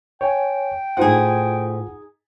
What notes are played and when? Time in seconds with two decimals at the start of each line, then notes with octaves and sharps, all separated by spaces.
0.21 C#5 G5 G#5
0.97 A2 D#4 F4 G#4 C5 F#5